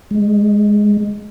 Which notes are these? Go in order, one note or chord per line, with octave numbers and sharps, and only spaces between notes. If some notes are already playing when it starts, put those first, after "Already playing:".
G#3